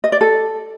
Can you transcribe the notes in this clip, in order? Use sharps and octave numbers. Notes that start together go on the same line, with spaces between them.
D#5
D5
A4